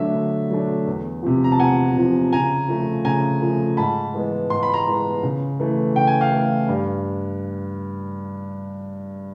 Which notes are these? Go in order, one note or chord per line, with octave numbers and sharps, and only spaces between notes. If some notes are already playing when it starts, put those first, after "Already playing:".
Already playing: D3 F#3 A3 D4 E5
D3
F#3 A3 D4
E2
C3 F3
A#5
A5
E2 F#5 G#5
C3 F3
C#3 G#5 A#5
F3 A3
C#3 G#5 A#5
F3 A3
G#2 A5 B5
E3 G#3 B3
G#2 C6
B5
A#5 C6
E3 G#3 B3
C#3
E3 A3
C#3 G5
G#5
F5 G5
E3 A3
G2